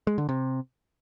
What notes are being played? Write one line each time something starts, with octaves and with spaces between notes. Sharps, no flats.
G#3
D3
C3